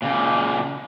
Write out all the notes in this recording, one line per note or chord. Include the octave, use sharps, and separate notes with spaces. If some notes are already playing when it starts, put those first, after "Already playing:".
A#2 C#3